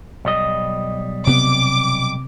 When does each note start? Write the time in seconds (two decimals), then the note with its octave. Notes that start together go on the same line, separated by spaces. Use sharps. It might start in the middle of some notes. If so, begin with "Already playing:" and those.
0.25 B1 G3 D#5
1.27 C3 B3 D6